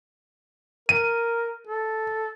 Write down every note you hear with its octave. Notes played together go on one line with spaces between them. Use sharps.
A#4 D#7
A4